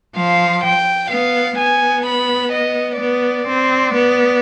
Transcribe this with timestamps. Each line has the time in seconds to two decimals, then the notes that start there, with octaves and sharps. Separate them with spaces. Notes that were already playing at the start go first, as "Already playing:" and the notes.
0.16 F3 F5
0.63 G5
1.10 B3 F5
1.58 B3 G#5
2.06 B5
2.53 D#5
3.00 B3 D5
3.48 C4
3.94 B3